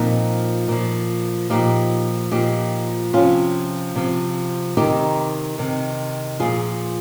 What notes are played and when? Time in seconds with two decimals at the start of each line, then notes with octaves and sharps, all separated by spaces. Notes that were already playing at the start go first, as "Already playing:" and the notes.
Already playing: A#2 F3 C4 D#4
0.68 A#2 F3
1.50 A#2 F3 D#4 G4
2.31 A#2 F3 D#4 G4
3.13 C3 F3 C#4 F4
3.95 C3 F3
4.77 C3 D#3 D#4 G4
5.58 C3 D#3
6.40 A#2 F3 F4 G#4